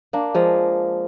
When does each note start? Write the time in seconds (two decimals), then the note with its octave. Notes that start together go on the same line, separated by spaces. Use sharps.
0.13 A#3 D4
0.35 F3 G#3